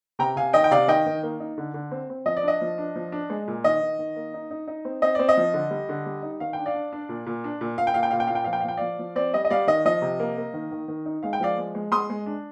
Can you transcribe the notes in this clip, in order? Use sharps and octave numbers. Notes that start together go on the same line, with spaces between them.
C3 G5 A#5
C3 F5 G#5
D#3 D#5 G5
G5
C3 D5 F5
D#3 D#5 G5
D#3
A#3
D#4
D3
D3
C4
C4
F3 D#5
D5
D4 D#5
F3
D4
F3
D4
G#3
A#2
D#3 D#5
D#3
D#3
A#3
D#4
D#4
D#4
C4
C4 D#5
C4 D5
D#5
F3
D3
G3
D3
G3
D#4
D#3 F5
D4 G5
D5 F5
D4
D4
A#2
A#2
D4
A#2
A#2 F5
G5
A#2 F5
G5
A#2 F5
G5
A#2 F5
G5
F3 F5
G5
F5
F3 G5
F3 D5 F5
F3
C4 D5
G3 D#5
D#5
G3 D5 F5
D#3 D#5
F3 D#5
C3
A#3
A#3
D#3
D#3
D#3
D#4
G#3 F5
G5
F3 D5 F5
G#3
G#3
G#3 C6 D#6
G#3
D4